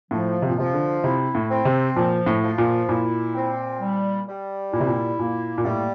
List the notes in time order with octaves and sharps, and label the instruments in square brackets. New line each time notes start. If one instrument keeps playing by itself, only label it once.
[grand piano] A2 [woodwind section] F3
[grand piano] C3
A#2
[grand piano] C3 [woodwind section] F3
[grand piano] D3
[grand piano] C3 [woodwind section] E4
[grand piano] A2
[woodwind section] C4
[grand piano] C3
[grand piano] A#2 [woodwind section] F3
[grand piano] A2
[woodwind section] F3
[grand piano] A#2
[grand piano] A#2 [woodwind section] E4
[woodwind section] C4
G3
G3
[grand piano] A#2 [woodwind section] E4
[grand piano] C3
A#2
[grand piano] A#2 [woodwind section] A#3
[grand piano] A#2
[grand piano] A2 [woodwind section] G3